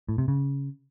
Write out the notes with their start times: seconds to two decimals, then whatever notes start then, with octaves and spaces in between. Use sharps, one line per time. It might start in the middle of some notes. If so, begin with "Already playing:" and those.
0.09 A2
0.18 C3
0.28 C#3